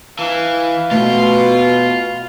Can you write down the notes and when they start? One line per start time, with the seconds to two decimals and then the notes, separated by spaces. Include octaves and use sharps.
0.19 E3 F5
0.91 B2 A3 F4 A5